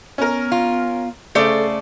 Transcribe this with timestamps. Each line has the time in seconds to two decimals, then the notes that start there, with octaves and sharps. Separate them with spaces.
0.18 B3 C#4 A#4
0.52 F4
1.35 C#3 A3 A4 C5 D5